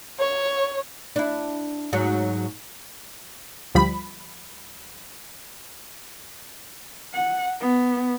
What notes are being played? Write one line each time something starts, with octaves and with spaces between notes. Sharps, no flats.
C#5
D4 E4
G#2 F#3
D2 F3 G3 B5
F#5
B3